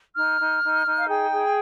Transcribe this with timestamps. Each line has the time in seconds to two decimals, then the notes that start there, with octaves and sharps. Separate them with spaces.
0.16 D#4 F6
0.40 D#4
0.63 D#4
0.85 D#4
0.98 F5
1.08 G#4 G5
1.32 G#4